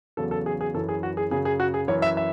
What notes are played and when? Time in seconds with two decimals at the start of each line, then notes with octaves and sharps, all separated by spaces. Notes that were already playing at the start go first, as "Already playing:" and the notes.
0.17 E2 C#3 F#3 A4
0.31 A4
0.46 G#4
0.61 G#4
0.74 F#2 E3 A4
0.89 G#4
1.03 F#4
1.17 G#4
1.31 F#2 C#3 F#3 G#4
1.45 G#4
1.60 F#4
1.74 G#4
1.88 F#2 E3 C#5
2.02 E5
2.17 E5